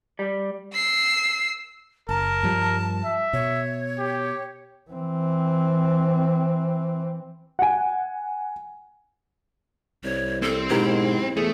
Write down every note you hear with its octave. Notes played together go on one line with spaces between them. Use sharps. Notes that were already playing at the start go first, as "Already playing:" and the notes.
G3
E6 C7
F#1 A#4 A5
G2 F3 G3
E5
B2 C#5
G4
E3 C4
F#5 G#5
C2 C#5
C4 A4
B1 G#2 E4 G4 A#4
E2 A3 G#4